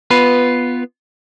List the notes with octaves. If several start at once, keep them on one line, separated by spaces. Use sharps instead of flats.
B3 F4 B4